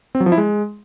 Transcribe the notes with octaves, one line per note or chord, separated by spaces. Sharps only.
C4
F#3
F3
E4
G#3